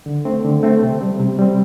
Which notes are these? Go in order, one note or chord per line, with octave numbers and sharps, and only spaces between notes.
D3
A3 C4
D3
A3 C4
C3
G3 C4
C3
G3 C4